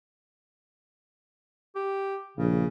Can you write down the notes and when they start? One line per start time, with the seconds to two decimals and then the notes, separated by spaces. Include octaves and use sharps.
1.76 G4
2.37 A#1 C#3